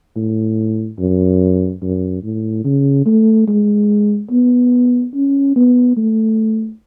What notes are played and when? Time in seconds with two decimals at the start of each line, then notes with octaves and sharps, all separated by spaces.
0.16 A2
0.99 F#2
1.82 F#2
2.23 A2
2.64 C#3
3.06 A3
3.47 G#3
4.31 B3
5.14 C#4
5.56 B3
5.97 A3